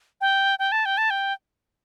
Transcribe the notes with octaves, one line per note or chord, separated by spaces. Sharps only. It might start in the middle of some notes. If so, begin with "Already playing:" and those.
G5
G5
A5
G5
A5
G5